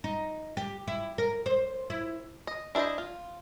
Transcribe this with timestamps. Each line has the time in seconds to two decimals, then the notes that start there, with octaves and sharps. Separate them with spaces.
0.04 D#4
0.57 G4
0.88 E4
1.18 A#4
1.46 C5
1.90 E4
2.47 D#5
2.75 D4 E4 B4 C5 D#5
2.98 F4